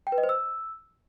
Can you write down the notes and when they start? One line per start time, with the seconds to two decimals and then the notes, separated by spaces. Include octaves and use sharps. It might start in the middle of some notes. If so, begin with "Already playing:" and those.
0.07 G5
0.12 B4
0.18 D#5
0.23 C5
0.29 E6